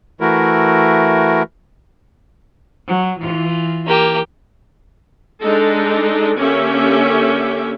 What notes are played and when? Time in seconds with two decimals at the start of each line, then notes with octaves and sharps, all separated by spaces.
0.21 E3 A3 E4 F#4 A#4
2.87 F#3
3.20 E3 F4
3.87 A#3 G4
5.41 G#3 D4 D#4 A4
6.38 D3 A#3 C#4 G4 E5